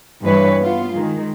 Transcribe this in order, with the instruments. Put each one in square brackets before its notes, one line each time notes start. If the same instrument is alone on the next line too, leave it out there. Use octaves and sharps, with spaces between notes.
[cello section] G2 E3 B4 C#5
B3 F4
D#3 G#3